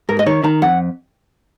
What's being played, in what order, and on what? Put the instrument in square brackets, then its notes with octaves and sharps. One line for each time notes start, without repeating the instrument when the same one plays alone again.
[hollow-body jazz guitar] G#2 [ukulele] A#4
[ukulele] D#5
[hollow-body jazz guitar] D#3 [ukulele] C#5
[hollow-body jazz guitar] D#3 [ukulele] A#5
[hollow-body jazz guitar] F2 [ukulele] F#5